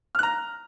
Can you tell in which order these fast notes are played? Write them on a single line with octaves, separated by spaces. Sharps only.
F6 F#6 A#5